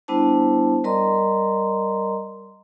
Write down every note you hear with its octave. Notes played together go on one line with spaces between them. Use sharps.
G3 B3 D4 E4 C5 A5
G3 A#4 D5 D#5 A#5 C6